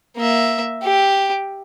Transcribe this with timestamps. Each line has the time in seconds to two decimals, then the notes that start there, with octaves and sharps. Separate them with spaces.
0.17 A#3 E5
0.84 G4